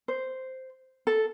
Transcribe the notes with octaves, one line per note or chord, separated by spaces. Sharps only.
C5
A4